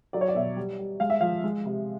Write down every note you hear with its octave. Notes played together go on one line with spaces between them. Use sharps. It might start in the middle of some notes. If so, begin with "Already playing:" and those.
F#3 D5
C#5
D5
B2 E5
G3
G3
G#3 F5
E5
F3 F5
G#3
C3